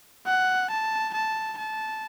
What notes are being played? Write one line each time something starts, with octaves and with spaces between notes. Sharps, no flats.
F#5
A5
A5
A5